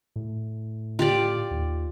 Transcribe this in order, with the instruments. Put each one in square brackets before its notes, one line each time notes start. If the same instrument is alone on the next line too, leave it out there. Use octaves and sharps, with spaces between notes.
[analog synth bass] A2
[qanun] F4 G4 D5
[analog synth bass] D#2